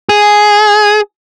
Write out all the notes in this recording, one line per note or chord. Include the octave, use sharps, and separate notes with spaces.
G#4